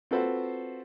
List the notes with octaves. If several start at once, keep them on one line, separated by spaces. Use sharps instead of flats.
C4 F4 F#4 A4 B4 C5